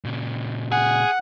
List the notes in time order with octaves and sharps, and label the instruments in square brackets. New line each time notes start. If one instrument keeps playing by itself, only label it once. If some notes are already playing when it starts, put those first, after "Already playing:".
[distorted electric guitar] A#2 C#3
[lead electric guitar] G#4 [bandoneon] F#5